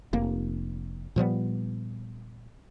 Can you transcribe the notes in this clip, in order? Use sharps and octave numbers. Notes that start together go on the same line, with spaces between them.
F1 A#3
A#2 F3 G3 B3